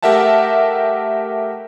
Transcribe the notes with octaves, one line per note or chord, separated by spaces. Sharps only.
A3 G4 A#4 E5 F#5 A5